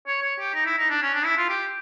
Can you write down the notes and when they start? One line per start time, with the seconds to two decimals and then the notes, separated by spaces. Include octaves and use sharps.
0.07 C#5
0.23 C#5
0.39 G4
0.54 D#4
0.66 E4
0.78 D#4
0.89 D4
1.02 C#4
1.14 D4
1.25 E4
1.37 F4
1.49 G4